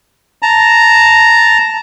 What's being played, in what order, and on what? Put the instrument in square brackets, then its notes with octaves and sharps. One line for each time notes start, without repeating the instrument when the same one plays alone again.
[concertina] A5 A#5